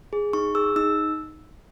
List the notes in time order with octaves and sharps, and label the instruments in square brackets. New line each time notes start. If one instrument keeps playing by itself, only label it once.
[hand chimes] G#4
D#4 C#6
G#4 E6
D#4 E6